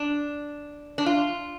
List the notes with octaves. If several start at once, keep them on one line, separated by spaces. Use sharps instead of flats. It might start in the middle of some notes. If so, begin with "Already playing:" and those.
Already playing: D4
D4
F4